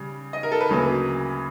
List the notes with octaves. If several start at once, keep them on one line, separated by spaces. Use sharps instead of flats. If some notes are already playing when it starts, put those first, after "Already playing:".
Already playing: C#3 G3
D#5
A#4
A4
B4
D2 C#3 F#3 A#3